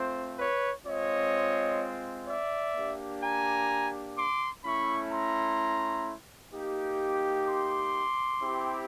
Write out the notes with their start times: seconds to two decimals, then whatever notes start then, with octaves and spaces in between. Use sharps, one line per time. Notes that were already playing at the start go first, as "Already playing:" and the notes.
Already playing: A3 C4 F4 C5
0.38 B4 C#5
0.86 G#3 C4 F4 C#5 D#5
2.27 D5 E5
2.75 A#3 D4 G4
3.22 G#5 A#5
4.16 C6 D6
4.63 A3 C#4 E4 B5 C#6
5.11 A#5 C6
6.53 A#3 D#4 G4
7.47 C6 D6
8.42 C4 E4 G4